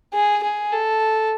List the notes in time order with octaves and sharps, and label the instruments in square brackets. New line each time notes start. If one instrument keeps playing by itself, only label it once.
[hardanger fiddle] G#4
G#4
A4